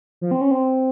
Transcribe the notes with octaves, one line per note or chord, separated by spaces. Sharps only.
F3
C4
C#4
C4